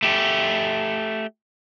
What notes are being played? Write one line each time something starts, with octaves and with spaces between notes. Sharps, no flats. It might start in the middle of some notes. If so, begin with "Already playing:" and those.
A3 G4